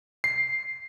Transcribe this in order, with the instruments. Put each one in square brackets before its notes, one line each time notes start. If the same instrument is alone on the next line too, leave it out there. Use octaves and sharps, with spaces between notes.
[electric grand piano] C7